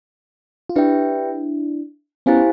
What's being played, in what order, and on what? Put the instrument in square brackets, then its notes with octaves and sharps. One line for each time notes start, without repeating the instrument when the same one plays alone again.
[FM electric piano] F4
[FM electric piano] D4 E4 [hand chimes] G4 B4 E5 G5
[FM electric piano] B3 C#4 [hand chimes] E4 G4 C5 F5 G#5